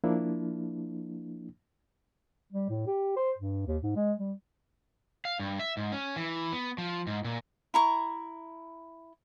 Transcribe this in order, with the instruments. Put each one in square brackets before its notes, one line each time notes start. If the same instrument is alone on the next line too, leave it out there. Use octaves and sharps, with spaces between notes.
[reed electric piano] F3 A#3 D4 E4
[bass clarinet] G3
A2
G4
C5
G2
D#2
G#2
G#3
G3
[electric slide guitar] F5
G2
E5
G#2
C#4
E3
B3
F3
G#2
A#2
[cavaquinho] E4 A#5 C#6